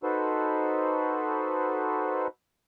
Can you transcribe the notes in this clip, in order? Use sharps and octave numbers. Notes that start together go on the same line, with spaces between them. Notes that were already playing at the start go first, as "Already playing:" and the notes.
D#4 F#4 A4 B4 C5